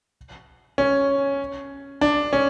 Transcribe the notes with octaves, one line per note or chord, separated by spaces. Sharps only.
C#4
D4
C#4